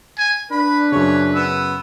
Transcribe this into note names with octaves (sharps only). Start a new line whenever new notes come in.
G#5
D4 B4 B5
F#2 C#3 C#5
B3 E6